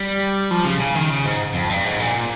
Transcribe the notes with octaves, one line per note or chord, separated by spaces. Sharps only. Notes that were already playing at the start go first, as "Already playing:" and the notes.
Already playing: G3
F3
C#3
C#3
D#3
C#3
G#2
F2
G2
G#2
A#2
A#2